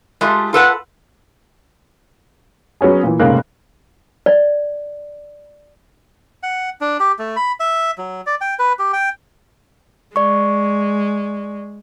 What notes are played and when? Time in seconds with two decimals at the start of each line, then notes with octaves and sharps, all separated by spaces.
0.21 G#3 A3 F4 G4
0.53 F4 A4 B4 F#5
2.81 F#3 B3 C#4 G#4
3.03 A#2 E3
3.20 F1 G#2 C#3 A#3 C#4 F#6
4.26 D5
6.43 F#5
6.81 D4
7.00 G4
7.19 A3
7.36 B5
7.60 E5
7.98 F#3
8.26 D5
8.41 G5
8.59 B4
8.79 G4
8.93 G5
10.16 G#3 D5 C#6